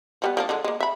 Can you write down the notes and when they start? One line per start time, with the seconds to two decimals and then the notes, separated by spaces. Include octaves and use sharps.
0.22 F3 G3 B3
0.37 F3 A#3 D4
0.49 D3 G#3
0.64 G#3 A#3
0.80 E5 B5